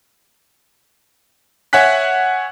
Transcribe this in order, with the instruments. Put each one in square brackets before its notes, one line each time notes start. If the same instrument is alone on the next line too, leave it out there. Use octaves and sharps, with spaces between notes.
[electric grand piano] C#5 E5 F#5 G#5 F#6 B6